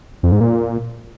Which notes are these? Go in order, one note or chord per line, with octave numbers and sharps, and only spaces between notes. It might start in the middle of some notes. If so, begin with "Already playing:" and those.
F2
G#2
A#2